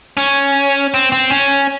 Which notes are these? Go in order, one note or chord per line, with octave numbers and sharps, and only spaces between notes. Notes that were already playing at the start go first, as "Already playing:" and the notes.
C#4
C4
C4
C#4